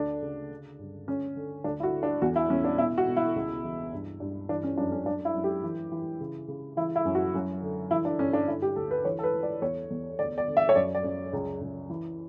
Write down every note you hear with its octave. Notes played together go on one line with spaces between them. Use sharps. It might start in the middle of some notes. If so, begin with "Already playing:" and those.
Already playing: D2 D4
C#3
D3
G2
D3 C#4
D3
D2 D4
E4
F#4
D3
D4
E2 F#4
E4
E2 C#4
D4
B2 E4
F#4
B2
E4
C#2
E3
G2
G2
E3 D4
C#4
F#2 D4
C#4
F#2 D4
E4
F#2
G4
E3
E3
C#3
C#3
E3 E4
E4
F#2
F#4
F#2
D3
E3 E4
D4
G2 C#4
D4
D3 E4
G4
D2 A4
B4
E3 C#5
A4
B4
E3
D5
E2 C#5
E2
D2 D5
D5
D3
E5
C#5
F#2 D5
D5
F#2
C#2
C#2
E3